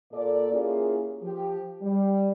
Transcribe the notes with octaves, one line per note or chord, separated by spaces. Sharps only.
A#2 A4 D5
A#3 C#4 E4 F4 G4 G#4
F3 G4
G3